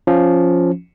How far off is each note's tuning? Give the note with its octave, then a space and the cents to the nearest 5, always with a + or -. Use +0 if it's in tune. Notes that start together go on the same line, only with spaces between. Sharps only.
F3 +0 C#4 +0 F4 +0